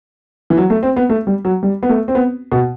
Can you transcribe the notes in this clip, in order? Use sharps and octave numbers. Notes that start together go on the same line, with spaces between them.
E3
F#3
A3
C4
B3
A3
G3
F#3
G3
B3
A3
C4
B3
B2